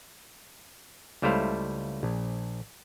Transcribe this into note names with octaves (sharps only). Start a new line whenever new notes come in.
C#2 G3 A3 E4 C5 F5
A#1